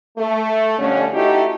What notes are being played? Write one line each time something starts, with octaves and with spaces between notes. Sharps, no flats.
A3
F2 D3 G3 C#4
A3 D#4 E4 F#4 G4